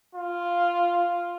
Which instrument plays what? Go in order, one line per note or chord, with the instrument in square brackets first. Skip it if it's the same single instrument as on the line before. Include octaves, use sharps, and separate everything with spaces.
[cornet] F4